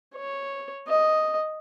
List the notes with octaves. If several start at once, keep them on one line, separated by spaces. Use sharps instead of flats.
C#5
D#5